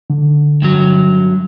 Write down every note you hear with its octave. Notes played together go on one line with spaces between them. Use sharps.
D3
G2 F#3